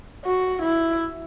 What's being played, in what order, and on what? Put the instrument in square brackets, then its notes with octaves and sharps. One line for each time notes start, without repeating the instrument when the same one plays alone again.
[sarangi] F#4
E4